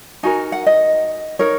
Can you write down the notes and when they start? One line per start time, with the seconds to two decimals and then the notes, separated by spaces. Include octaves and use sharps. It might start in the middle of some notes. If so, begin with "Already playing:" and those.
0.23 D#4 F#4 A#4 G#5
0.52 F#5
0.66 D#5
1.39 D#4 A#4 C#5